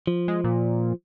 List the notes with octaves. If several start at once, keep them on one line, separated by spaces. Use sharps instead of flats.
F3
G#3
A#2